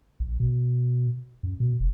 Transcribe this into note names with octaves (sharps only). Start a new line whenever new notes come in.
A#1
B2
F#2
B2
F1